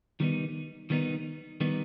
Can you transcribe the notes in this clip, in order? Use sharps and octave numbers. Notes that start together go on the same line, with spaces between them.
D#3 G3 B3 D#4
D#3 G3 B3 D#4
D#3 G3 B3 D#4